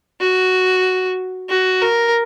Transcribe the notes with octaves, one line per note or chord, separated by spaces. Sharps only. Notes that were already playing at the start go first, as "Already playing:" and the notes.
F#4
F#4
A#4